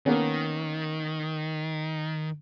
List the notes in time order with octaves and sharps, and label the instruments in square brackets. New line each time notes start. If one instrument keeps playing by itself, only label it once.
[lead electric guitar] D#3 [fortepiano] A#3 B3 C#4